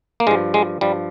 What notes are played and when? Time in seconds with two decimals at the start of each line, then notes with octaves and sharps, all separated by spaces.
0.20 A#3
0.27 G2 F3 G#3
0.54 G#3
0.81 G2 F3 G3